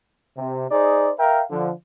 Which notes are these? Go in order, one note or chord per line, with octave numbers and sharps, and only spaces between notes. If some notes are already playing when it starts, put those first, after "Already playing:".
C3
D#4 G#4 C5 D5
A#4 E5 F5 G5
D3 F3